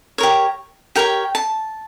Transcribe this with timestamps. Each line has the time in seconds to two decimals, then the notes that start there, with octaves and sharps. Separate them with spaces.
0.18 G4 A#4 C#5
0.95 G4 A#4 C#5 G5
1.35 A5